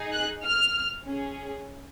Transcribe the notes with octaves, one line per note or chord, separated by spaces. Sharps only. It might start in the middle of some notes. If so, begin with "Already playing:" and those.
Already playing: D#4 G#4
F#6
F6
C#4 G#4